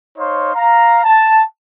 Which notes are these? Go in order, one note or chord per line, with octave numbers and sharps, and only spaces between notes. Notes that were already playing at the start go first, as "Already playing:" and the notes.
D#4 C5 C#5 F5 C6
F5 A#5
A5